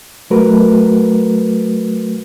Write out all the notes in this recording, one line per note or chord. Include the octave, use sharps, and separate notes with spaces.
F#3 A3 F#4 A#4 B4